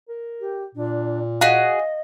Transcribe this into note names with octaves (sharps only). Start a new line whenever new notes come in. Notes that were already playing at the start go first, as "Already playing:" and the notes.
A#4
G4
A#2 D4
F#4 G#4 D#5 F5